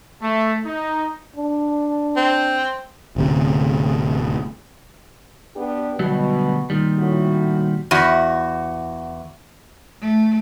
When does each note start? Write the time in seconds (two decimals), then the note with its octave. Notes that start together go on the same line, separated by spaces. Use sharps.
0.22 A3
0.65 D#4
1.36 D4
2.17 C4
3.16 D1 D2 C3
5.56 B3 D4 G4
5.99 D2 B2 F#3 G3
6.70 A#2 D#3 G3
6.99 A2 F#4
7.91 E2 F#4
10.02 A3